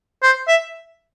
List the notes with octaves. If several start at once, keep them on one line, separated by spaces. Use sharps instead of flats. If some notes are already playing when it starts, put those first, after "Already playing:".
C5
E5